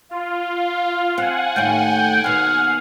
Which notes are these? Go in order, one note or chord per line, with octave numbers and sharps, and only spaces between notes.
F4 F5
C4 F#5 G#5
D#2 A2 A3 G5
D#2 B2 F5